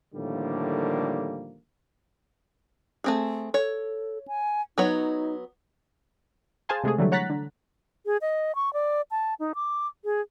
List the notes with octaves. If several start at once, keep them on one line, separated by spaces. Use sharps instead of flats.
A2 D3 D#3 F3 G3 A#3
A3 C4 G#4
A4 C#5
G#5
F#3 B3 D#4 C#5
G#4 C5 F5 G#5 A5 C6
C3 G#3 A3 G#4
D3 E3 F#3 G3 A3
C#5 F#5 A#5 F#6 A6 B6
D3
G#4
D#5
C#6
D5
A5
D#4
D6
G#4